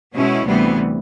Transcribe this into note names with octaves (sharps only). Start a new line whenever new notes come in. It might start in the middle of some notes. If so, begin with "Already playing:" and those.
B2 G#3 C#4 E4
D2 C3 E3 G3 B3